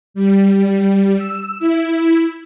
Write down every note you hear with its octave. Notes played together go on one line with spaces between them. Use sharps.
G3
E6
E4